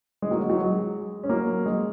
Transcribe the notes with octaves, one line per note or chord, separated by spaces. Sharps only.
G#3
F#3 A#3
G#3
F#3
G#3
C#4
F#3 A#3
G#3